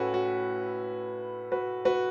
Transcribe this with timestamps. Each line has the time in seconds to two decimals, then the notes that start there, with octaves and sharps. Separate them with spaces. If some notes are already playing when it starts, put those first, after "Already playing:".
Already playing: A2 A3 C#4 E4 F#4 B4
0.14 F#4
1.52 F#4 B4
1.85 F#4 B4